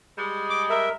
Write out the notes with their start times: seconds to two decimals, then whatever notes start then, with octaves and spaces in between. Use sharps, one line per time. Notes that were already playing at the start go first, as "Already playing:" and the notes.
0.16 G3 G#3
0.50 D6
0.70 A#4 E5